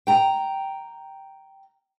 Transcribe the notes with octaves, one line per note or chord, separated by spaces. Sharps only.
G5 A#5